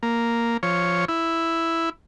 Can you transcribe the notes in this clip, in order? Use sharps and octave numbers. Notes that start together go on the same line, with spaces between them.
A#3
F3 C#5
E4